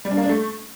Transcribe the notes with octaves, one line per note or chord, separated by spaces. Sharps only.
G3
D4
A#3
D4
A3